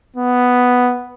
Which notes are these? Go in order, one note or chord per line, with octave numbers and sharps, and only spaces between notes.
B3